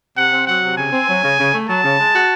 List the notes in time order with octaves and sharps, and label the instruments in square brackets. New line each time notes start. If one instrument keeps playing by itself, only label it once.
[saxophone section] C3 [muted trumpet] F#5
[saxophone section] C4
[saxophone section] F#3 [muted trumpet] F#5
[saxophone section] C3
[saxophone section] C#3 [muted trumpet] G#5
[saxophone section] C4
F#3
C#3
C#3
A3
[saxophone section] F#3 [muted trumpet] A5
[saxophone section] C#3
G#3
F#4